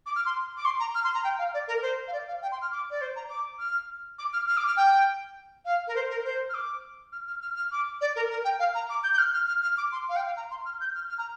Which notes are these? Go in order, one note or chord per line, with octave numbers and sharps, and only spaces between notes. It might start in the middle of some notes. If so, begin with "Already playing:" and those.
D6
F6
C6
D6
C6
A#5
F6
C6
A#5
G5
F5
D5
A#4
C5
F5
D5
F5
G5
C6
F6
D6
D5
C5
A#5
D6
F6
D6
F6
F6
D6
F6
G5
F5
A#4
C5
A#4
C5
F6
D6
F6
F6
F6
F6
D6
D5
A#4
A#4
G5
F5
A#5
D6
G6
G6
F6
F6
F6
F6
D6
C6
F5
G5
F5
A#5
C6
F6
G6
F6
F6
A#5